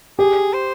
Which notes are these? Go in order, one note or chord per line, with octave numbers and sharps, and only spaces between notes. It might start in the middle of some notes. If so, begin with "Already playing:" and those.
G4 G#4
C5